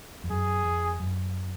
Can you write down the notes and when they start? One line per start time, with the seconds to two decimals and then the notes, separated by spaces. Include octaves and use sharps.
0.24 F2
0.30 F#2 G#4
0.65 F2
1.00 F#2